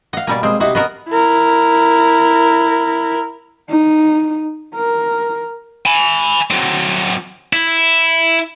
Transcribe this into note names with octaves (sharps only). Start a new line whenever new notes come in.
D#5 F5 F#5
B2 G3 A#3 D5 G#5
G#3 C4 G#4
C3 D#4 E4 F#4
B3 F#4 A#4 D#5
E4 A#4
D#4
A#4
G#5 B5
F#3 C4
E4